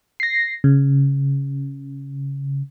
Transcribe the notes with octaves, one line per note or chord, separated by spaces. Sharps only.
A#6 C7
C#3